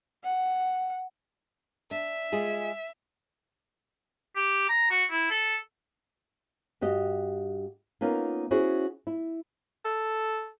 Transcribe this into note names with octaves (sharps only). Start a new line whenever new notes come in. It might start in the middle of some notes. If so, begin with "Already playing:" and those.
F#5
D4 E5
G#3 F4 G#4
G4
A#5
F#4
E4
A4
G2 F#4 G4 D#5
A#3 B3 C#4 D#4 F4
C#4 E4 F#4 G#4 C5
E4
A4